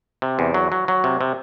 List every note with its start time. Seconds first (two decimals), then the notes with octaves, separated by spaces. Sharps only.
0.22 C3
0.39 E2
0.54 F#3
0.72 F#3
0.88 F#3
1.04 C3
1.21 C3